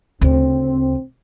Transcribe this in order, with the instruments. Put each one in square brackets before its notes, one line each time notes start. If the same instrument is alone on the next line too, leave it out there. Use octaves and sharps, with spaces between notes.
[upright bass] D2 C#3 [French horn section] C4